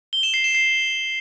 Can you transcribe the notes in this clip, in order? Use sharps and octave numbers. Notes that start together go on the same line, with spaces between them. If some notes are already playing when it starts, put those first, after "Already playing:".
G7
E7
C7
E7
C7